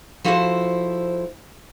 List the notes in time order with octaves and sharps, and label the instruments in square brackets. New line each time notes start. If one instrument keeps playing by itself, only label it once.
[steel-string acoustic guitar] F3 E4 F#4 A4 B4 C5